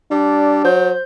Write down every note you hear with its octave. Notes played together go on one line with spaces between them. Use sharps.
G3 D4
F#3 C5 G6